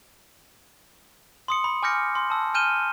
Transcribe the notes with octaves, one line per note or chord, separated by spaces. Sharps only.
C6 D#6 C#7
B5
G#5 D6 F6 G6 A#6 C#7
C6
A5 E6
G#5 F6 G6 D#7 E7 G7